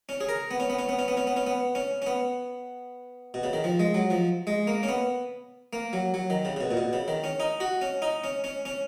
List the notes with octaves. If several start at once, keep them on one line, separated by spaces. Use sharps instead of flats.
C#4
G#4
A#4
B3
C#4
B3
C#4
B3
C#4
B3
C#4
B3
C#4
B3
C#4
C#4
B3
B2
C#3
D#3
F3
G#3
F#3
F3
G#3
A#3
C#4
B3
A#3
F#3
F#3
D#3
C#3
C#3
B2
A#2
B2
C#3
D#3
C#4
D#4
F#4
C#4
D#4
C#4
C#4
C#4